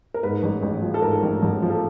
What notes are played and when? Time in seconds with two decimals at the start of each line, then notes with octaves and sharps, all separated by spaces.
0.14 A#4
0.23 G#2 B4
0.43 A1
0.62 A1
0.82 F3
0.94 A4
1.02 G#2 A#4
1.23 A1
1.42 A1
1.62 F3
1.70 A4